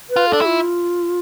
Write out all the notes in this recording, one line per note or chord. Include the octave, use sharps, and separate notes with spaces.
B4
F4
D4 A4
E4
F4